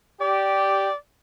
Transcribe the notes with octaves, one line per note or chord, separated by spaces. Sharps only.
G4 D5